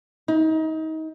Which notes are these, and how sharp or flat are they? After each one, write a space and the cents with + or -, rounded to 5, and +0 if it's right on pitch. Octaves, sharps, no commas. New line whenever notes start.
D#4 +30